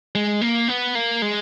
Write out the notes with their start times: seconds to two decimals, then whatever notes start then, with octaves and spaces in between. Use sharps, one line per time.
0.15 G#3
0.41 A#3
0.68 B3
0.95 A#3
1.22 G#3